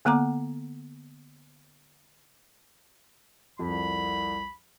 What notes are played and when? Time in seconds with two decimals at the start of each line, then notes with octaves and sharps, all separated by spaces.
0.05 D3 A#3 B3 F#5 A#5 D6
3.59 C2 F2 B5